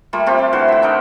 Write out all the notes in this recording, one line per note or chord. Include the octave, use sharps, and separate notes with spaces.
G3 A3 A#3 F4
A3 C4 F4 G4
D5
D3 E3 F#4 C6
F#4 E5
D4 D#4 A#4